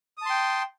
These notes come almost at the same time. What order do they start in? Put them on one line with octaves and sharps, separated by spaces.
D#6 A5 C6 G5